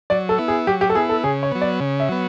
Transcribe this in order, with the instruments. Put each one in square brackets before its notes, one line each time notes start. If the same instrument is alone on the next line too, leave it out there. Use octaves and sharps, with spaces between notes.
[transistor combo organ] F#3 [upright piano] D5
[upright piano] A4
[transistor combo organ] B3 E4
[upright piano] G#4
[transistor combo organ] F#3 [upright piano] G4
[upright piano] G4
A4
[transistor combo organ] B3 E4 [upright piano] G#4
[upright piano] A4
[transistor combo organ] C#3 [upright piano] G#4
[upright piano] C#5
[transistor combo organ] F#3 B3
[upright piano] D5
[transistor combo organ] C#3
[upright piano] E5
[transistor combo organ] F#3 B3